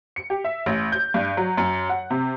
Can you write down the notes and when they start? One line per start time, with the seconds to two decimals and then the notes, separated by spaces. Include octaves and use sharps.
0.16 C#7
0.30 G4
0.44 E5
0.66 A1
0.92 G6
1.14 G2
1.37 F#3
1.57 F#2
1.89 F#5
2.11 C3